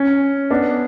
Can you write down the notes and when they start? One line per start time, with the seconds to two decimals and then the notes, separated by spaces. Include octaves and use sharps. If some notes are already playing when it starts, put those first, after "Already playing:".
Already playing: C#4
0.51 B3 D4